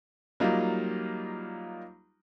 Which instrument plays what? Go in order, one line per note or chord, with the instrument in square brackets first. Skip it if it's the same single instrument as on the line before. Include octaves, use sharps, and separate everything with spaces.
[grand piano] F#3 G3 A#3 D#4 F4